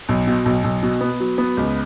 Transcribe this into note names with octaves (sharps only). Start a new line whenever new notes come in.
B1
B2
B1
B1
B2
B3
F#3
B3
C#2